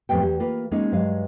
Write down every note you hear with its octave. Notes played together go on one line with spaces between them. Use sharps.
F2 A2 G3 B3 G5
E2 G4
A#3 F4 B4
G#3 A#3 C#4 D#4 F4
G2 F#3 G#3 F5